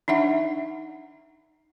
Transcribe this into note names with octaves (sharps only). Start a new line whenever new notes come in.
D4 D#4 E5 F#5